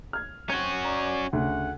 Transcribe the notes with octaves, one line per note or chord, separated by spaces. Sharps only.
F6 G#6
C4 C#4 F#4 G#6 G7
D5 A#5
D2 C#3 F#5